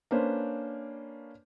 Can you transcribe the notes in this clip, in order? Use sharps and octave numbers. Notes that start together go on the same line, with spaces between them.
A#3 C#4 D4 B4 C5